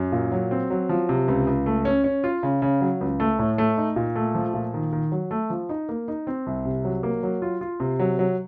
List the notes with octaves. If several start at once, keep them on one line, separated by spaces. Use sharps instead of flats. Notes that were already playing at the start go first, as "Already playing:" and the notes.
Already playing: F#2
A#2
F#3
C4
F#3
F3
C3
C#2
C#2
A3
C#4
C#4
F4
C#3
C#3
F#3
C#2
A3
A2
A3
D#4
A#2
A3
F3
A#2
D#3
D#3
F#3
A3
F3
D#4
A#3
D#4
C4
C2
C3
F#3
A#3
F#3
F4
F4
C3
F#3
F#3